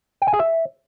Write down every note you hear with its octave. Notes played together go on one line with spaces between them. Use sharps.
G5
G#5
G#4
E5